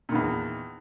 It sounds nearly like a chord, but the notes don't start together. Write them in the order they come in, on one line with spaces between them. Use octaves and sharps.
A#2 D#3 E2